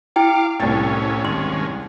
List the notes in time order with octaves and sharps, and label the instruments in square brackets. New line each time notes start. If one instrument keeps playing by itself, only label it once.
[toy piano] E4 G5 [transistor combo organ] F5 D6
[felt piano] C2 A6 [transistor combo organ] A2 C#4
[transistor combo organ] D#2 G#2 C#4 [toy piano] C6